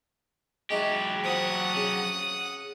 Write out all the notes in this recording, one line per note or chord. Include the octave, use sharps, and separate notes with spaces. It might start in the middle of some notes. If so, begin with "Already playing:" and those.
F#3 G#3 D#4 E4 G4
F3 F#5 D#6
C#3